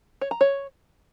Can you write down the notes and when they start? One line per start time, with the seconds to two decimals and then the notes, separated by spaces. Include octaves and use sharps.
0.21 C#5
0.31 A#5
0.41 C#5